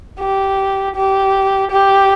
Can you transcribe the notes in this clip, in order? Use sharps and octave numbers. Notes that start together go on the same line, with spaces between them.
G4
G4
G4